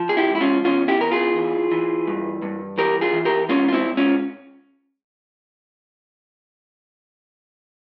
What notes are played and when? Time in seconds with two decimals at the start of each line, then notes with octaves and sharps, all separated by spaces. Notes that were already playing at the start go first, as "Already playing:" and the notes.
Already playing: F3
0.09 G#4
0.17 E4 G4
0.30 G#2
0.35 E4
0.41 C#4 F4
0.64 E2 C#4 F4
0.88 E4 G4
1.00 E3 A#4
1.12 F4 G#4
1.36 E3
1.71 E3
2.07 G2
2.42 G2
2.78 E3 G4 A#4
3.01 F4 G#4
3.13 E3
3.25 G4 A#4
3.49 G#2 C#4 F4
3.68 F4
3.73 C4 E4
3.86 G#2
3.97 C#4 F4